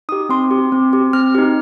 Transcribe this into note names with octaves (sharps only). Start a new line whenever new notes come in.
D#4 G4 D#6
C4 C6
G4
C4
G4
C4 F6
D#4 G4